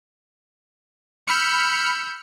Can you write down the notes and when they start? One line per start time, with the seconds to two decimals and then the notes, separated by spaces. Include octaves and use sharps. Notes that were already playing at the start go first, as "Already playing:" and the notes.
1.27 B5 E6 F6 G6 C#7